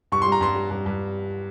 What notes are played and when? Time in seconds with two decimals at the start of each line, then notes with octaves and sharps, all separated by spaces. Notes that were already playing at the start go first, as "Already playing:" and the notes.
0.12 G2 C#6
0.22 G3 C6
0.32 A#5
0.41 G2 C6
0.56 G3
0.70 G2
0.86 G2